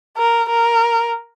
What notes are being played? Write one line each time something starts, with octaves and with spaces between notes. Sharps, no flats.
A#4
A#4